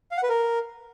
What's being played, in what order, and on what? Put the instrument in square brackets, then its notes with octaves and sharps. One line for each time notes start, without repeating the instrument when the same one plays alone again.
[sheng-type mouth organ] F5
F#5
B4
A#4